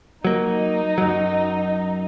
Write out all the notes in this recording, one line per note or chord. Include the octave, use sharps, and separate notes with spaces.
F#3 A#3 D#4
F#2 F#3